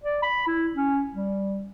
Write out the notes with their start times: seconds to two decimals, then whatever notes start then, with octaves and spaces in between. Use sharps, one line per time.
0.03 D5
0.23 B5
0.47 E4
0.75 C#4
1.13 G3